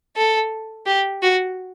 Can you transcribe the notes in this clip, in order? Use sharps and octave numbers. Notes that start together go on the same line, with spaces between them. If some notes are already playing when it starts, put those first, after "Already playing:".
A4
G4
F#4